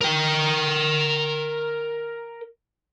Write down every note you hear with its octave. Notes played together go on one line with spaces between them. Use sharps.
A#4 G5